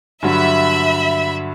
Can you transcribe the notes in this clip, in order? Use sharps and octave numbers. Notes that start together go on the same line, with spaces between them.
G2 D3 F#3 E5 B5